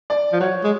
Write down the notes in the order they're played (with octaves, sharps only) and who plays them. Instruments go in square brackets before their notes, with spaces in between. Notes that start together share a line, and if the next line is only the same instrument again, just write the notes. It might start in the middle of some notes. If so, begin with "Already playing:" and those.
[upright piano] D5
[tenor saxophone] F3
[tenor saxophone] F#3 [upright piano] C#5
[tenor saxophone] G#3